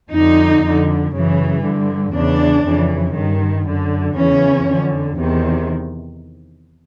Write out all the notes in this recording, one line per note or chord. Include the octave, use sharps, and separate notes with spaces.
F2 D3 D#4
F2 D3
F#2 C#3 E3
G2 D3
E2 C#3 E3 D4
F2 C#3 E3
G2 D#3
F#2 D3
E2 C#3 E3 C#4
F2 D3
E2 C3 D#3